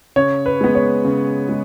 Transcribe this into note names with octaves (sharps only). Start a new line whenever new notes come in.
C#3 C#5
B4
G#3 B3
C#5
C#3
G#3